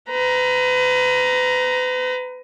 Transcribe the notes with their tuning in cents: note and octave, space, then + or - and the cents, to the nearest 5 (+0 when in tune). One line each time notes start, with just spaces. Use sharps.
B4 +35 A#5 +10